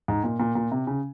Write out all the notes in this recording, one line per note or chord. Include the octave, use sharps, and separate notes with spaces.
G#2
A#2
A#2
A#2
C3
C#3